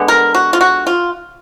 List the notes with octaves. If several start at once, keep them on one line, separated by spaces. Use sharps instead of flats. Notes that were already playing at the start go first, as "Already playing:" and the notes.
Already playing: D3 G#3 B3
A#4
F#4
F4
F#4
F4